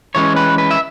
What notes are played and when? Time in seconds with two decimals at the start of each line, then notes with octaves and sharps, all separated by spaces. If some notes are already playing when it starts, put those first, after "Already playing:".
0.15 E3 G#3 C#4 C#5
0.36 B4
0.58 B4
0.71 E5